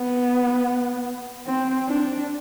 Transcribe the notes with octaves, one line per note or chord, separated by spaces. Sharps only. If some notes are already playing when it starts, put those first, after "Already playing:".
Already playing: B3
C4
D4